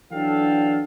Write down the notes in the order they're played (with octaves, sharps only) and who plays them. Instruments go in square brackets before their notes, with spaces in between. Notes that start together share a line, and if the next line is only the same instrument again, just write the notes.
[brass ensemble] E3 F#3 D4 A4 F5 G5